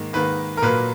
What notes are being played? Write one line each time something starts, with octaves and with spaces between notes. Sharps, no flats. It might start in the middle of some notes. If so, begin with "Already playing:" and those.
Already playing: G#2 D#3 A#3
G#2 D#3 A#3 B4
A#4
A#2 F#3 A#3 B4